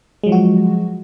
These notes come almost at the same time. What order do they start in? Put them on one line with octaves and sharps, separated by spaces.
G#3 F#3 F3 F#4